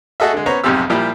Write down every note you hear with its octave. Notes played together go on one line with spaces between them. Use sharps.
A3 F#4 G#4 A4 D#5 E5
D3 G#3
B3 C#4 C5 C#5 A#5
B1 F2 G#2 C3 G4 E6
A#2 F3 G3 E4 G4